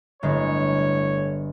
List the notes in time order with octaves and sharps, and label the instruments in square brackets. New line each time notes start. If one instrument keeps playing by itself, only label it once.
[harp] G1 G#3 [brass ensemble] A2 C#5